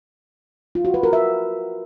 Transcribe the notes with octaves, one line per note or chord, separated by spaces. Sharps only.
F4
F#4
B4
A#4
E5